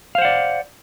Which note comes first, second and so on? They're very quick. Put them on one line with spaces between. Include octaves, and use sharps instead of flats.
F5 C5 F#5 D5